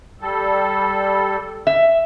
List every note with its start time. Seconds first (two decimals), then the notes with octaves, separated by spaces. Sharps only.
0.21 G3 A4
1.67 E5